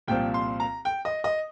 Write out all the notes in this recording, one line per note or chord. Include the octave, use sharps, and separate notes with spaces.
C2 A#2 F3 C4 G5
C6
A#5
G5
D#5
D#5